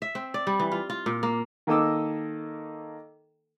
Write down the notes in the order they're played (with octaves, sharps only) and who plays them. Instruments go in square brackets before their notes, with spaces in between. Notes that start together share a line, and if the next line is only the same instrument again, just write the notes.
[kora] E5
C4
D5
G3
E3
F4
F4
A#2
A#3
[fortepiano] D#3 A#3 A4 D#5 D6 E6